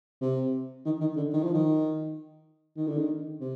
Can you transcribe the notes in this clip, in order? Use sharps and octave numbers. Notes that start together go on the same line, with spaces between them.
C3
D#3
D#3
D3
D#3
F3
D#3
D#3
D3
D#3
C3